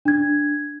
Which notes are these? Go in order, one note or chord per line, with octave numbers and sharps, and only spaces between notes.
D4 G#6